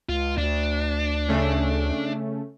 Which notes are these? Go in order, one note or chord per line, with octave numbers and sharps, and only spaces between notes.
C#2 F4
D2 D4
C#3 A3 C#4